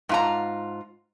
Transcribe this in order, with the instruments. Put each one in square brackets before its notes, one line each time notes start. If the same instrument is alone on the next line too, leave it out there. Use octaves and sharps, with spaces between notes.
[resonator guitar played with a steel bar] G#2 F4 A#5